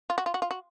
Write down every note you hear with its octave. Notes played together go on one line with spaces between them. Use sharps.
F4
F#4
F4
F#4
F4
F#4